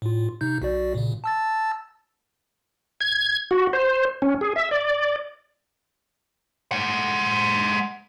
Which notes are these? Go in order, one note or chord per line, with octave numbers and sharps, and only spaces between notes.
A2 F4
C3 D#4 G6
B1 F#4 D5
A#2 C#3
A5 E6 A6
G#6
F#4
C5
C#4
G#4
E5
D5
G#3 F#5